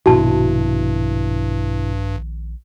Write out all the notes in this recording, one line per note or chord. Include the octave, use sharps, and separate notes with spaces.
A#1 G2 B2 D#3 E4 F#4 A5